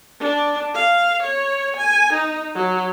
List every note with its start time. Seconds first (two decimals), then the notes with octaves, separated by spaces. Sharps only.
0.20 D4
0.75 F5
1.23 C#5
1.77 G#5
2.13 D#4
2.56 F#3